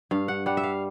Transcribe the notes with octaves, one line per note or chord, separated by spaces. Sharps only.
G2 F5
F#5
G3 F#5
E5
F5